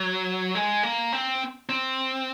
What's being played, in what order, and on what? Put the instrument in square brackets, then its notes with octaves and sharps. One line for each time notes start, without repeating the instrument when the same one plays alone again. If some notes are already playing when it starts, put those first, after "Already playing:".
Already playing: [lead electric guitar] F#3
G#3
A#3
C4
C4